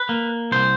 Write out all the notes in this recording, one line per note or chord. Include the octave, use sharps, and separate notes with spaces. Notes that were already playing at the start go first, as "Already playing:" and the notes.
Already playing: B4
A#3
C2 C5